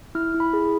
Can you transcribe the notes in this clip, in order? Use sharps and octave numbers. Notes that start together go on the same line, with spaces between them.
E4 F6
E4
B5
G#4